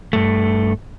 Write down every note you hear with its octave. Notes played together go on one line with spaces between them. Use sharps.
G2 A3